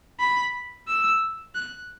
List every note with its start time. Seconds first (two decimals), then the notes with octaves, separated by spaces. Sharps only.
0.20 B5
0.88 E6
1.55 F#6